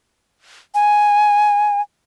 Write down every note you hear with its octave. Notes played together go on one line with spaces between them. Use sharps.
G#5